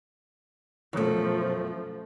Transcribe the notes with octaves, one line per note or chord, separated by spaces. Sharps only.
F#2 B2 F3 A3